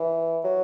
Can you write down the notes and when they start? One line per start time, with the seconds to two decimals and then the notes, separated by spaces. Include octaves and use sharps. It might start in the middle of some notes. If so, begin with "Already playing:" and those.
Already playing: E3
0.44 F#3